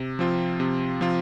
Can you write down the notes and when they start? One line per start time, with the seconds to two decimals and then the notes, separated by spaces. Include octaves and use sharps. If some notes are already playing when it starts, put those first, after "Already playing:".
Already playing: C3
0.19 F3 C4 F4
0.60 C3
1.01 F3 C4 F4